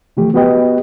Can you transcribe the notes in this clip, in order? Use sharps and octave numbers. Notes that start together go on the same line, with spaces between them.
C3 E3 F3 A3 G4
B3 F#4 G4 B4 D#5 G5